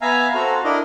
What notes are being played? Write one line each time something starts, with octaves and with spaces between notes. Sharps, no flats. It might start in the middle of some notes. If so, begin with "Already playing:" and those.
B3 E5 F5 G#5 A#5
C4 F#4 A4 F5 A#5
D4 E4 A#4 D#5